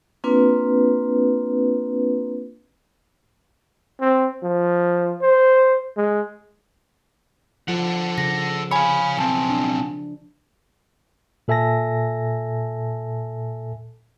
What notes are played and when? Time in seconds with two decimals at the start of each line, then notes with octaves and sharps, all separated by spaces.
0.24 A#3 C4 D4 F4 B4
4.00 C4
4.43 F3
5.22 C5
5.97 G#3
7.68 F3 F4 A4 F#5
8.18 C#3 A#6
8.71 C#5 F5 G#5 B5
9.17 B1 C4 G#5 A5
9.50 D4
11.48 A#2 A4 E5 G#5 A5 A#6